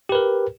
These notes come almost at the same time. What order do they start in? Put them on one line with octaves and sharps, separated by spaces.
G4 B4 A#4